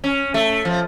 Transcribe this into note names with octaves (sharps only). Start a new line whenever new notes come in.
C#4
A3
F3